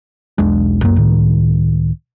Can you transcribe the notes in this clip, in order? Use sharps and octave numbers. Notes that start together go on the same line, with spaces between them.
E1 B1 G#3 D4
C#2 F#2 A#3
C#2 A2 D#3